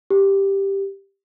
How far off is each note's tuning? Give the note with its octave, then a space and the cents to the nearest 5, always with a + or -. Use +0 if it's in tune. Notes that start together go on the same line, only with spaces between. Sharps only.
G4 +5